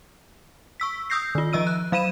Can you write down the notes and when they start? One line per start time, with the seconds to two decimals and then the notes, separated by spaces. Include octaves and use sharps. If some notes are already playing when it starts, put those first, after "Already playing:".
0.80 C#6 E6 B6
1.10 D#6 E6 G6 A#6 C7
1.35 D#3 F4
1.53 F3 D#5 E6 D#7
1.67 F#6
1.92 F#3 F5 B5 D#7 E7